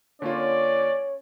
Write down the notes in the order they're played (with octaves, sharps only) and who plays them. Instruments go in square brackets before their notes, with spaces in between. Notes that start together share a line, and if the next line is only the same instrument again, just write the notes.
[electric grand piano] D3 A#3 F4 [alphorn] C#4 [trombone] C#5 [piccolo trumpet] D5